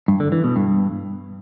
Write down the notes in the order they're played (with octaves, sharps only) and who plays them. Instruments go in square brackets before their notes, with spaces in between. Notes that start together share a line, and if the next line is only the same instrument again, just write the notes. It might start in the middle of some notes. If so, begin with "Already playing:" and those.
[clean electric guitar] G2
D3
E3
B2
G2